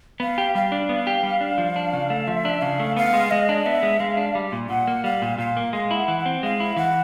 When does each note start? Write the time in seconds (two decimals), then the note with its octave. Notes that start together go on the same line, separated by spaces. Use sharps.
0.20 B3 F5
0.38 G4
0.55 G3 F5
0.72 D4
0.89 B3
1.07 G4
1.23 G3
1.41 D4
1.58 F3
1.76 D4
1.93 C#3
2.10 A3
2.28 F3 E5
2.45 D4
2.62 C#3 F5
2.80 A3
2.97 B3 F5
3.14 G#3
3.31 G#3 D#5
3.49 D4
3.66 B3 E5
3.83 G#3
4.00 G#3 F5
4.17 D4
4.35 G3
4.52 A#2
4.70 A#2 F#5
4.88 A#3
5.04 G3 F5
5.22 A#2
5.38 A#2 F5
5.57 A#3
5.73 G#3 F5
5.91 E4
5.96 F#5
6.08 E3
6.19 F#5
6.26 C4
6.43 G#3 F5
6.60 E4
6.76 E3 F#5